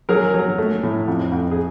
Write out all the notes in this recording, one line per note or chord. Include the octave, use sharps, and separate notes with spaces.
F#3 G#4 A#4
F#3
A3
A2
F2
F2
G#4